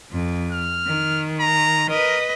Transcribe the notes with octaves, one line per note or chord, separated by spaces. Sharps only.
F2
F6
D#3
A#5
A#4 B4 D#5